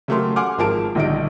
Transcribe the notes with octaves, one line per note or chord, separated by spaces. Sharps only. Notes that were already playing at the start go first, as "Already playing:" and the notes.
C#3 F#3 A3 G4 A#4 C6
F#5 G#5 C6 D6 F6
G#1 F3 G#4 A#4 A5 D7
A#1 D3 D#3 G3 D#4 D7